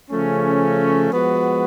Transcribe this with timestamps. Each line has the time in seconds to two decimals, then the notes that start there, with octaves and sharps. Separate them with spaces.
0.11 C#3 F3 A3 C#4
1.12 F3 G#3 B3 F#4